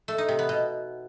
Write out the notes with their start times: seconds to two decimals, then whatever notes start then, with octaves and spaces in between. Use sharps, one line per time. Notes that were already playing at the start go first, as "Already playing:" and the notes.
0.08 A3
0.18 D#4
0.29 C3
0.39 B3
0.49 B2